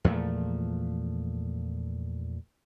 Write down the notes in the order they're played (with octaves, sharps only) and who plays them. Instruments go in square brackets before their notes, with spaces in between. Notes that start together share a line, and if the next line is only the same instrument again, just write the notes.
[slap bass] E2 A#2 F3 A3